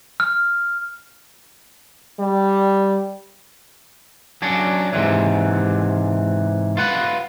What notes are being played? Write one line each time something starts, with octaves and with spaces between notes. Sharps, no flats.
F6
G3
F#3 C#4 D4
G#2 C3 E3
F4 B4 F#5